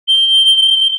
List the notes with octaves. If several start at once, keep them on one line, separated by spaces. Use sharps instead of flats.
G7